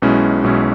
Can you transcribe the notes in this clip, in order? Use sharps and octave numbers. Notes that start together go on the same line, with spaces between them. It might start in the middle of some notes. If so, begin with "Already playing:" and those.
B1 B2 G#3 C#4 E4
B1 B2 G#3 C#4 E4